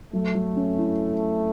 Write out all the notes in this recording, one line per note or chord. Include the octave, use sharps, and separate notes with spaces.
F#3 A3
F#3
C#4
E4